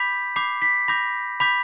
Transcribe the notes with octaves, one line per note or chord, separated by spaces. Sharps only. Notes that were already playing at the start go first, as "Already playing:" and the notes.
Already playing: B5 D6 G6 B6
B5 D6 G6 C7
B6
B5 D6 G6 A#6
B5 D6 G6 B6